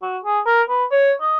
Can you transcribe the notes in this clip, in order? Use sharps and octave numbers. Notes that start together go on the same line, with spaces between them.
F#4
G#4
A#4
B4
C#5
D#5